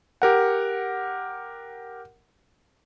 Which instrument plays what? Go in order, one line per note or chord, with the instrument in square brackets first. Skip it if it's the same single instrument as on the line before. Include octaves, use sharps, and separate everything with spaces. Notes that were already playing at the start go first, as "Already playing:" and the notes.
[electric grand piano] G4 A#4 F#5